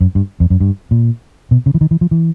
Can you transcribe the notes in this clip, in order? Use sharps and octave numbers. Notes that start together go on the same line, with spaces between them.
F#2
G2
F2
F#2
G2
A#2
B2
C#3
E3
D#3
E3
F3
E3